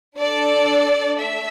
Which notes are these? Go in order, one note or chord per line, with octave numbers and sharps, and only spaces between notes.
D4 A4 D5
A3 E5